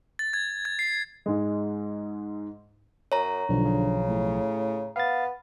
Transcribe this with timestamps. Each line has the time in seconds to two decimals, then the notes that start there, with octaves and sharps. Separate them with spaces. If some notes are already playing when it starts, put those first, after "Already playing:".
0.19 A6
0.33 G#6
0.65 G#6
0.79 C7
1.26 G#2 G#3
3.12 F#2 C#5 A#5
3.49 B1 D3 F3
3.65 C#3
4.09 A2
4.96 B3 F5 A6